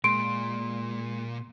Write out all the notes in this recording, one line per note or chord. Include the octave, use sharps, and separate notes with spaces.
A#2 G#3 C6 D7